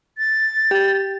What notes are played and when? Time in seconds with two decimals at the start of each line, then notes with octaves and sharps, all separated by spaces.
0.18 A6
0.71 G4